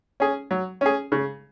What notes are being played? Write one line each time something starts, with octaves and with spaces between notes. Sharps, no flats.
C#4 G#4
F#3
C#4 G#4
C#3